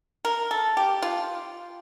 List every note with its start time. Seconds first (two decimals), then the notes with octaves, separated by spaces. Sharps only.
0.25 A#4
0.51 A4
0.77 G4
1.02 F4